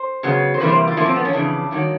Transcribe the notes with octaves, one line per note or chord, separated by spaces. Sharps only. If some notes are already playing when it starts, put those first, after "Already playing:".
Already playing: C5
C#3 F#3 B3
C5
C3 E3 G3 A#3 B4
C5
F4
A#2 F3 A#3 E4
C4
B3
C#4
F2 C#3 E3 D4
G2 D#3 F#3